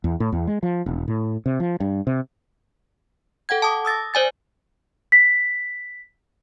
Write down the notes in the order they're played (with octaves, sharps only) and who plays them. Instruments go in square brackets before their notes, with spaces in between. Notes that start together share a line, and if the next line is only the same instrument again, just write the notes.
[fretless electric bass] E2
A2
E2
G#3
F3
E1
A2
C3
F3
G2
C3
[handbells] A4 F#5 G5 G#6
A5 D6 D#6
D#6 E6 A6 A#6
C5 D5 G#5 A6
[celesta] B6